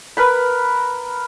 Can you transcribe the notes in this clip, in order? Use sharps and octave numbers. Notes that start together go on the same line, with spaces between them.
A#4 B4 B5